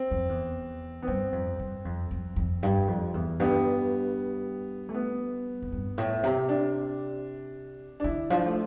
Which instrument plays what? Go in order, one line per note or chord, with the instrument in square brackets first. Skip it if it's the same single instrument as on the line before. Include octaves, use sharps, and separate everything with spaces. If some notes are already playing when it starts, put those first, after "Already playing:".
Already playing: [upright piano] C4
[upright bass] F2
E2
[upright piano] B3
[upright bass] G2 [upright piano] C4
[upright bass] F2
G2
F2
F2
F2
G2
F2
E2
[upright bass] G2 [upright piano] B3
[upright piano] A3
B3
[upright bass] F2
G2
A2
C3
[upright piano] D4
D4
[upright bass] D3 [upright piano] E4
[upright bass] F3 [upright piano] D4
[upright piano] A3